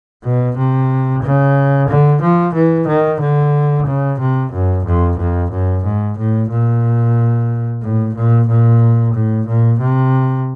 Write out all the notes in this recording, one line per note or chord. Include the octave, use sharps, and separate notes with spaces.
B2
C3
C#3
D3
F3
E3
D#3
D3
C#3
C3
F#2
F2
F2
F#2
G#2
A2
A#2
A2
A#2
A#2
A2
A#2
C3